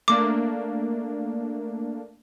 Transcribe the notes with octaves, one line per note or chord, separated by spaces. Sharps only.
A3 A#3 D4 D6